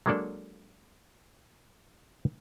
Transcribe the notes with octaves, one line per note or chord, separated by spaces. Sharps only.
F#3 G#3 A#3 D4 A4 D5